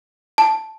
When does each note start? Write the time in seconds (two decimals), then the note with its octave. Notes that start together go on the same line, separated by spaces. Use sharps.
0.38 A5